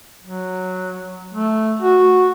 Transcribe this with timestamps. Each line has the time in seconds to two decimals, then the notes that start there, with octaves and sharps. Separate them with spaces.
0.23 F#3
1.34 A3
1.82 F#4